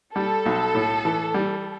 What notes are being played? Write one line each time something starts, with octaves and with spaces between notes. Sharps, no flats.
G3 A4
B1
A2
E3
G3